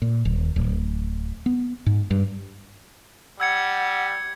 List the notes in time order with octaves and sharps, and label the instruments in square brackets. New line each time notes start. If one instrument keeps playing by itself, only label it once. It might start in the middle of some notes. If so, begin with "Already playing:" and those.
[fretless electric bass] A#2
D#1
D1
B3
G#2
G2
[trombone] G3 [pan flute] F#5 [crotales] E6 G#6 C#7